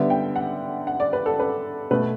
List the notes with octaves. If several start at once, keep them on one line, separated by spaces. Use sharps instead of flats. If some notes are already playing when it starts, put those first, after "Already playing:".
Already playing: D3 G3 B3 E5
G5
F#5
F#5
D5
B4
A4
B4
B2 A3 B4